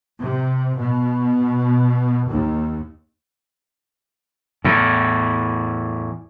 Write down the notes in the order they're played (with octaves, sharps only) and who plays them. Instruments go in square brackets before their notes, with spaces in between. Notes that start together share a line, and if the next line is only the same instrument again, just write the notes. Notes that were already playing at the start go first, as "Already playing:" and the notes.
[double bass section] C3
B2
D#2
[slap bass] E2 A2